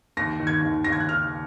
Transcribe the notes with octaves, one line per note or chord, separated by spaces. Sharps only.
D#2 A#6
D#3
G#6
D#2
D#2 A#6
G#6
F#6
D#3 F6